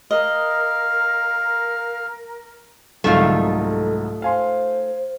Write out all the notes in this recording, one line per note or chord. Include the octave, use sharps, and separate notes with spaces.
A#4 D#5 F5
C2 G#2 D3 F#3 A3 D#4 F4
A4
C5 F5 G#5 C6